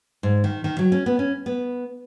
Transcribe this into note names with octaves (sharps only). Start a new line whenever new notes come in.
G#2
D#3
D#3
F#3
C#4
B3
C#4
B3